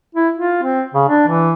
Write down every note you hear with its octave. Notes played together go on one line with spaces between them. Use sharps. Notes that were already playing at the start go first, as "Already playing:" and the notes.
E4
F4
C4
C#3
D4
E3